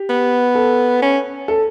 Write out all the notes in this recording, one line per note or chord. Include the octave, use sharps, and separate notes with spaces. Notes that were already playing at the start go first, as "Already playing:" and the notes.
Already playing: G4
B3
A4
C#4
A4